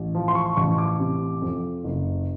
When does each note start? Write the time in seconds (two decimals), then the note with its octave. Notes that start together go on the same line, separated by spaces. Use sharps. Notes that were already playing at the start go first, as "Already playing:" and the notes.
Already playing: A1
0.15 F3
0.28 C6
0.35 C#6
0.57 A1 C#6
0.78 D6
1.00 C3
1.41 F2
1.84 F#1